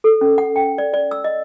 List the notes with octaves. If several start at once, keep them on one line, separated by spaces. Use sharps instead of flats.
A4
C#4
F#5
G5
D5
D5
E6
D#5